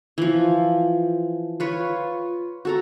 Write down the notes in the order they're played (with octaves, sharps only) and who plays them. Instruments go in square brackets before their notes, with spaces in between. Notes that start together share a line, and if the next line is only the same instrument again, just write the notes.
[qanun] E3 F3
F4 B4 C#5
F#4 A4 A#5